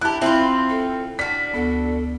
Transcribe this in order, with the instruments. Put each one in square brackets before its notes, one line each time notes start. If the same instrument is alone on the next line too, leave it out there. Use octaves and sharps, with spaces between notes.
[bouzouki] E4 G4 [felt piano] A5 F#6
[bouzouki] C4 F4 [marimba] E4 [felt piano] E5 [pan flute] B5
[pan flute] A4
[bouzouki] D4 F#4 [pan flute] F6 [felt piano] B6
[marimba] D2 B3 [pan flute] A4